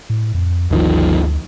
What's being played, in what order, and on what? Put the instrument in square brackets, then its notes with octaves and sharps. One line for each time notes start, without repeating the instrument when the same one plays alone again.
[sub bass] A2
F2
[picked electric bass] G1 D#3 F3 [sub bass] D2